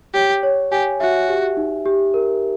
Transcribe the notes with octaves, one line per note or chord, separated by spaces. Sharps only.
G4 C#5
C#5
G4 G#5
F#4 E5
G4
D#4
G4
A#4